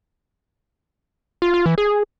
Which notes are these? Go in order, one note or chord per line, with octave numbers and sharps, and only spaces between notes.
F4
F4
E3
G#4